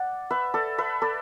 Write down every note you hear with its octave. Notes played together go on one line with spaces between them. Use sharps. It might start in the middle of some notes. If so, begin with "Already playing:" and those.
Already playing: D5 F#5
B4 E5
A4 D5
B4 E5
A4 D5